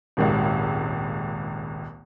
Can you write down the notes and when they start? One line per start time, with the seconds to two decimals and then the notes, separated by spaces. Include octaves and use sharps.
0.17 D#1 G#1 C#2